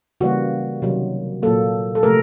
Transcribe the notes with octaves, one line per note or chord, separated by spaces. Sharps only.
C#3 E3 G3 A#3 F#4
C3 D#3 F#3
A#2 F#3 A#3 A4
A4
C3 F3 A3 A#4